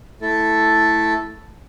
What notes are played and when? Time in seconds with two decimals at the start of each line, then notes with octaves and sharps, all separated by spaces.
0.22 A3 E4 A4